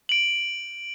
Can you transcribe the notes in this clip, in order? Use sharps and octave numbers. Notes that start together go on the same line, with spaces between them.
D7 F#7